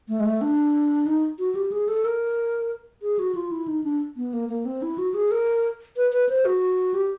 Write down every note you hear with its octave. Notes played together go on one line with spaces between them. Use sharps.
A3
G#3
A3
D4
D#4
F#4
G4
G#4
A4
A#4
G#4
F#4
F4
E4
D#4
D4
B3
A#3
A#3
C4
E4
F#4
G#4
A#4
B4
B4
C5
F#4
G4